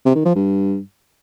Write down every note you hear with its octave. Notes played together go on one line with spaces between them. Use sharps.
C3
D#3
F3
G2